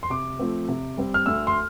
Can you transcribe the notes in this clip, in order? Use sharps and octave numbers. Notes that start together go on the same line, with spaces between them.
C6
C3 D6
F3 A3 C4
C3
G3 C4
F6
D2 E6
C6